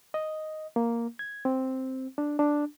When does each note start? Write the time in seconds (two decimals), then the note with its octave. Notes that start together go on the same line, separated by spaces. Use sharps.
0.14 D#5
0.76 A#3
1.19 G#6
1.45 C4
2.18 D4
2.39 D4